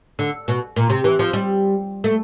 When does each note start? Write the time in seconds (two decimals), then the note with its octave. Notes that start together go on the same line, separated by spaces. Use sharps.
0.19 D3
0.48 B2
0.76 A#2
0.90 C3
1.04 E3
1.19 F3
1.33 G3
2.04 A3